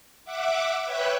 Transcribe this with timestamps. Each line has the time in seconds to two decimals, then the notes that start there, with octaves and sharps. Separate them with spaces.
0.25 E5 F#5 D6
0.85 B4 C#5 E5 G5 F#6